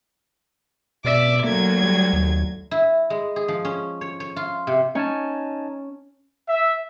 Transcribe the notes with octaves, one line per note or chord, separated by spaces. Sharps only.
B2 D5 E5 D6
D2 F#3 A#3 G#6
G3
D#2
E4
G#3
G#4
F3
C#4
C#5
C#5
F4
C3
C#4 D#4 G#5 A5
E5